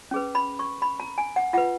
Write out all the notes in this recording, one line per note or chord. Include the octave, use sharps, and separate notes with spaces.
C#4 G#4 B4
B5
C#6
B5
A#5
G#5
F#5
F4 B4 F#5